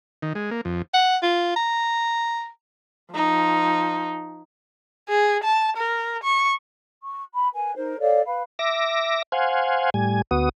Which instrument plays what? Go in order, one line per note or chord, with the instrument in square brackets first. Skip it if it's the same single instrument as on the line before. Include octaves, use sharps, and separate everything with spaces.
[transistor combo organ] D#3
G#3
A#3
F2
[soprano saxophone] F#5
F4
A#5
[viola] F3 D#4
[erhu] G#4
A5
A#4
C#6
[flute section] C#6
B5
A#4 B4 G#5
D#4 A#4 C5
A4 C#5 D5 F5
B4 F5 B5
[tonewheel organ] E5 D6 A#6
C5 F5 F#5 G#5
A2 G3 G#5
D2 B3 F#4 D#6